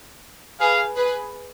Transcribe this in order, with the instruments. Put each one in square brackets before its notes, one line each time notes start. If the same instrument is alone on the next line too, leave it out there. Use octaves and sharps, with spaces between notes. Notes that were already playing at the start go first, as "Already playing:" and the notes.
[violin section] G#4 B4 [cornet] F5
[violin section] G#4 B4